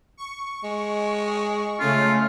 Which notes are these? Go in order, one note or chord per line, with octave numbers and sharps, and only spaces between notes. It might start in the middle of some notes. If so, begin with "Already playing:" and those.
C#6
G#3
C#3 G#3 A3 C#4 F4